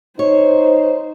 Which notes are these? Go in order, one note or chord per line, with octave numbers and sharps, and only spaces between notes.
D#4 C5 C#5